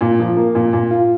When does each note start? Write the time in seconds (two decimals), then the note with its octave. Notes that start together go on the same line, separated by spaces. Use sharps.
0.01 A#2
0.20 F3
0.37 A#3
0.55 A#2
0.73 A#2
0.91 F4